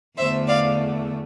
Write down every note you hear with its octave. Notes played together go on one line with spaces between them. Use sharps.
E2 D3 A3 C5 E5
D5 F5